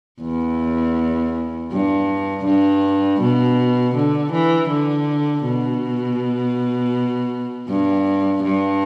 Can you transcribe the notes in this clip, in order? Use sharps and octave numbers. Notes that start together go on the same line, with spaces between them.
E2
G2
G2
B2
D3
E3
D3
B2
G2
G2